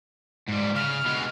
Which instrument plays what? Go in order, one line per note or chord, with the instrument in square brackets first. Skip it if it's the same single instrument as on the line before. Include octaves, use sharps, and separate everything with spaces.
[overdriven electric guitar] G#2 G3
[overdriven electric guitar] C#3 [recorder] F6
[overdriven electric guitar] B2 G#3